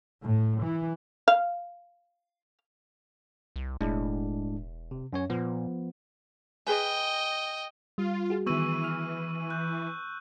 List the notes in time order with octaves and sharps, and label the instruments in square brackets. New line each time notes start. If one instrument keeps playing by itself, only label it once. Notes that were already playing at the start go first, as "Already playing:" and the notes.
[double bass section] A2
E3
[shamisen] F5
[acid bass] C2
[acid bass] E1 [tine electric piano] A2 G#3 D4
[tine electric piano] C3
F#2 C#4 C#5
[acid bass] A#2 [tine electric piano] F3 B3
[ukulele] G#4 B4 G#5 [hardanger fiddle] D#5 G5
[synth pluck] G3 [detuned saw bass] F4
[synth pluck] F#4 G#4
[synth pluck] D#3 B3 [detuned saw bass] E3 [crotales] C#6 E6 D#7
[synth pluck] F6
[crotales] F#6 G6